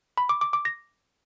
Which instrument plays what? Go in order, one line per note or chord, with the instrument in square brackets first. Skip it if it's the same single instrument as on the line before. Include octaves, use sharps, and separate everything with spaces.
[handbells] B5
D6
D6
D6
A#6